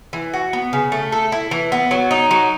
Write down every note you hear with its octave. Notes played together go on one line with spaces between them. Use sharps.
E3
F#4
B3
C#3
A3
A4
E4
E3
B3
F#3
D#4
F#3